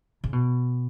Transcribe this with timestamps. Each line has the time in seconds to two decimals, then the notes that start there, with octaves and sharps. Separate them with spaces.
0.24 C#3
0.33 B2